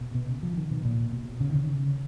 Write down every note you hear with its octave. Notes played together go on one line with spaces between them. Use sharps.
B2
B2
C#3
F3
D#3
B2
A#2
B2
C#3
D#3
C#3